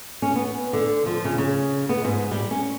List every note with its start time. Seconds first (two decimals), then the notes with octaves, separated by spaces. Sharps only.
0.22 C#4
0.36 B3
0.73 D3
1.06 F3
1.25 C#3
1.38 C#3
1.89 B3
2.05 G#2
2.31 G3
2.51 C#4